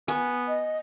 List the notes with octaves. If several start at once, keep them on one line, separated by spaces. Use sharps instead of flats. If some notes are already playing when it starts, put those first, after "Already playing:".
B3 G#5
D#5